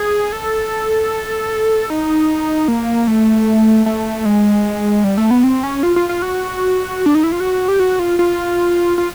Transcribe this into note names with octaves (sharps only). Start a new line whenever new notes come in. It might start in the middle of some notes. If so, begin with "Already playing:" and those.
Already playing: G#4
A4
D#4
A#3
A3
A3
G#3
G3
A3
B3
C4
C#4
F4
F4
F4
F#4
D4
D#4
E4
F4
F#4
G4
F#4
F4
F4
F4